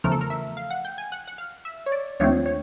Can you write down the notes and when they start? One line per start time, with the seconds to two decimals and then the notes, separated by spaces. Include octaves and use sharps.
0.04 E2 C#3 F3 A3 A#4
0.12 A4
0.21 A#4
0.30 E5
0.57 F5
0.70 F#5
0.85 G5
0.98 G#5
1.12 F#5
1.28 F#5
1.38 F5
1.65 E5
1.86 C#5
1.92 D5
2.20 D#2 D3 F3 A3 C4 C#5
2.46 C#5